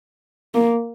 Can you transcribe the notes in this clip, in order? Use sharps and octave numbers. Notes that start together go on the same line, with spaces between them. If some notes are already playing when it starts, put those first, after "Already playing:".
A#3